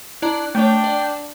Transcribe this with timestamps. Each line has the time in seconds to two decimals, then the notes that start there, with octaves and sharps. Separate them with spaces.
0.22 D4 E4 D5 A#5 F#6
0.55 A3 D4 C#5 G5
0.84 D5